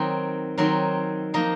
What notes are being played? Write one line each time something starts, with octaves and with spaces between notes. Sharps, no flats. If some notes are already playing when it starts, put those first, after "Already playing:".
Already playing: D#3 F#3 C4 D#4
D#3 F#3 C4 D#4
F3 A#3 D#4